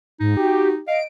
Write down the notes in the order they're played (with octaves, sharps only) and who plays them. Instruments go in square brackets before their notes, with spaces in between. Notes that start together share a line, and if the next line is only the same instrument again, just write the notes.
[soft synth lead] G#2 [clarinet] D#4
[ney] F#4 [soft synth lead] G4
[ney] D#5 [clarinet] F5 [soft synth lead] D7